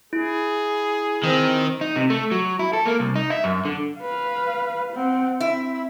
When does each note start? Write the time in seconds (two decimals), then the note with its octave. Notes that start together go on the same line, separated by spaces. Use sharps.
0.13 E4 G#4
1.23 D#3 C4
1.81 D#4
1.96 C3
2.10 A3
2.31 F#3
2.59 E4
2.73 A4
2.86 A#3
3.00 C2
3.16 D#4
3.30 E5
3.44 F#2
3.65 D3
3.98 B4 F5
4.93 C4 F#5
5.40 C4 E4